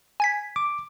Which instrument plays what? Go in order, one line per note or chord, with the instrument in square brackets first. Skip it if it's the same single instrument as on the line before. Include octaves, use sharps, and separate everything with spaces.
[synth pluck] G#5 G#6 B6
[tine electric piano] D6